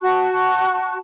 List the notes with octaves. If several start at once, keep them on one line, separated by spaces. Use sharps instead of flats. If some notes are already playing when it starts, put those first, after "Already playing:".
F#4 A5 C#6 F#6